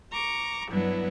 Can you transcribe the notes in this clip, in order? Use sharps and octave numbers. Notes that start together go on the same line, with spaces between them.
A#5 C#6 D6
G2 F#3 B3 D4 E4